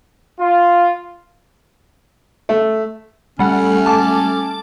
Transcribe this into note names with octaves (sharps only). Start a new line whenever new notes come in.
F4
A3
G3 A3 C#4 F#5
A5 D6